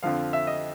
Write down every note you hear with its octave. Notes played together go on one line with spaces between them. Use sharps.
F2 D3 F3 F5
E5
D#5